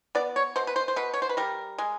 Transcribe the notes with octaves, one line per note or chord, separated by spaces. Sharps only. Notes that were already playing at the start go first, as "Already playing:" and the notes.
B3 D5
C#5
B2 C5
B4
C5
C5
B2 B4
C#5
C5
B4
G3 A#4
G#3